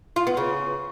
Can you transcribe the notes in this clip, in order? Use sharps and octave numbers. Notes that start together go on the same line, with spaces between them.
F4
B3
C#3